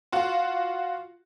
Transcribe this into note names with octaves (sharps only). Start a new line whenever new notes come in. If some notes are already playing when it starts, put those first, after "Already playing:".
F4 F#4